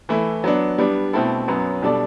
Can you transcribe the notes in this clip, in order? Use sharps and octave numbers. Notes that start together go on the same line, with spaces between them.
E3 A3 E4
F#3 B3 D4
G3 B3 D4
B2 A3 C4 E4 A4
F#2 F#3 B3
B2 G3 D4 A4 D5